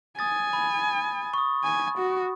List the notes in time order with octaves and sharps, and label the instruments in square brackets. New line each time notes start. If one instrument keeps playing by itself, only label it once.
[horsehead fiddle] G#5 [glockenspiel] D#6 A6
[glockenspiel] B5
C#6 D#6
[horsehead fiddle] G#5
F#4